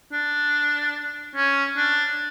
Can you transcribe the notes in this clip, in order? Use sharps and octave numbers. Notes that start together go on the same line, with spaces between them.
D4
C#4
D4